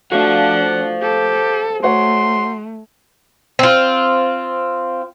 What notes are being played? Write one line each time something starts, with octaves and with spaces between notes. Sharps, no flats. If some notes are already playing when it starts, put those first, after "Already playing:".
A3 D4 F#4 C5 F5 F#5
G4 A4
A3 F#4 C#5 F#5 C6
C4 F4